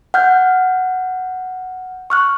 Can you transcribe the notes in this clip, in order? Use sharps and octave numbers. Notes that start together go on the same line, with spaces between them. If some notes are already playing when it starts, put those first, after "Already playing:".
F#5 F6 G6
C#6 F6 F#6